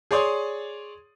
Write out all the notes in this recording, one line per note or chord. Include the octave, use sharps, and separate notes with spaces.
G#4 C#5 D5 C6 D#6